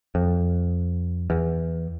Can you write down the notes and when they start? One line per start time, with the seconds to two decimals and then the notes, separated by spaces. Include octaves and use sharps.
0.15 F2
1.30 E2